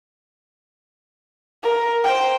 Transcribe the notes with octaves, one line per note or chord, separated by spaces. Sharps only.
A#4
C5 G5